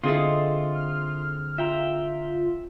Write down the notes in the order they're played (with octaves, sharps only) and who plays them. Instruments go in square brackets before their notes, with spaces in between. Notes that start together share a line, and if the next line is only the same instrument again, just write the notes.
[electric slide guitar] D3 G#4 A4 [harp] C4 E4 [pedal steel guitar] F4 [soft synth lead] D#5
[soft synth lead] F6
[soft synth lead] F4 [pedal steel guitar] E5 G5 A#5